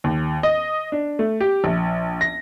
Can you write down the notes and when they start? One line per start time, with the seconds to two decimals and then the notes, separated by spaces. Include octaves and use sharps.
0.04 D#2
0.43 D#5
0.92 D4
1.19 A3
1.40 G4
1.64 A#1
2.21 A#6